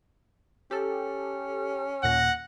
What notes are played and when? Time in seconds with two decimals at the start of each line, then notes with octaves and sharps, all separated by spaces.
0.71 C#4 G4 A4
2.03 D#2 A#2 F#5 A#6